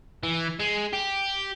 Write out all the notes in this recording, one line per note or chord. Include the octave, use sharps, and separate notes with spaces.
E3
G#3
G4